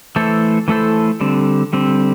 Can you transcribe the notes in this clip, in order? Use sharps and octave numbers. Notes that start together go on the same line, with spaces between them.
E3 A3 E4 A4 C5
E3 A3 E4 A4 C5
D3 G3 C4
D3 G3 C4